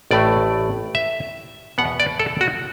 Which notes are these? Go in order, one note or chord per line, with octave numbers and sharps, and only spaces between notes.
A1 A2 A3 D5
E5
E2 B2 B3 F#5
D5
A4
F#4